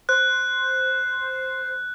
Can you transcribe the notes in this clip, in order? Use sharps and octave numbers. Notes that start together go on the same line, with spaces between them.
C5 F#6